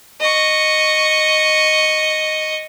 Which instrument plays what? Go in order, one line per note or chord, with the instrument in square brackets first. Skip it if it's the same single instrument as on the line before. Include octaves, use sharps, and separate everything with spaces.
[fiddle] D#5 C#6